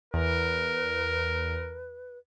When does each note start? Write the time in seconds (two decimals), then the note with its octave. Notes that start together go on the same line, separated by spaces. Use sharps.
0.14 E2 A#4 B4